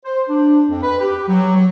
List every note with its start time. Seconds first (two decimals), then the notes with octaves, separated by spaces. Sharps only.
0.05 C5
0.29 D4
0.69 F2
0.82 B4
1.00 G4
1.28 F#3
1.55 F#3